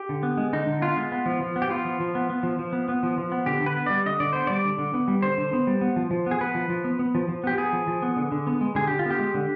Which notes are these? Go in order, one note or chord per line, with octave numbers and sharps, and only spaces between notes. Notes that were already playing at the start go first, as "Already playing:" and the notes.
Already playing: G4
D3
B3
G#3
D3 D#4
D3
B3 F4
G#3
B3
F3
F3
B3
G4
B3 F4
F3
F3
B3
B3
F3
F3
B3
B3
F3
F3
B3
D3 G4
D3
B4
B3
G3 D5
D3 D#5
D3 D5
B3 C5
G3 D5
D3
D3
B3
G3
D3 C5
D3
B3
G3
B3
F3
F3
B3 G#4
B3 B4
F3
F3
B3
B3
F3
F3
B3 G4
B3 G#4
F3
F3
B3
D3
D3
B3
G#3
D3 G#4
D3 G4
F4
B3 G4
G#3
D3